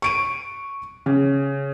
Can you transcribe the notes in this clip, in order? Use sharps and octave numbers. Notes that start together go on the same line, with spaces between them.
C#6 D7 D#7
C#3